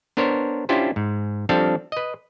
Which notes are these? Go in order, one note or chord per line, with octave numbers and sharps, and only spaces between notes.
B3 D4 A#4 C5 C#5
C#4 D4 E4 F4 G4 C5
G#2
F3 G3 C4 D4 A4 F5
B4 D#5